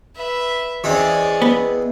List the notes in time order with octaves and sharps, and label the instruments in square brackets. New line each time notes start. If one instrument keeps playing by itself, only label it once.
[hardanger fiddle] B4 E5
[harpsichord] E2 G#3 C4 [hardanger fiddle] C#4 D5
[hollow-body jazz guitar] B3